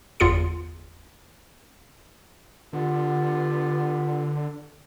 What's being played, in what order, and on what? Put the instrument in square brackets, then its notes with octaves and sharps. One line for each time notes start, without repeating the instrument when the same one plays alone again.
[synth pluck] G1 E2 F4 G#4 C#7
[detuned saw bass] D3 [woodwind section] B3 F4 G4